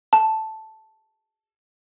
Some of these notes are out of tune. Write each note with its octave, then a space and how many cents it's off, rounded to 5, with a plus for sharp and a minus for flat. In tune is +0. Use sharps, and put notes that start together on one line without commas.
A5 -5